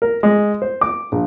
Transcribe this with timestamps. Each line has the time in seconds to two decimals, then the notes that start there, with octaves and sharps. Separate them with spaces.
0.02 A#4
0.23 G#3
0.62 C5
0.81 D6
1.12 A#1